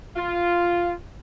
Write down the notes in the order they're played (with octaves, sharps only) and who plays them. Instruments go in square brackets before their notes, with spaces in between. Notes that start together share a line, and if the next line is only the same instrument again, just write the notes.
[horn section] F4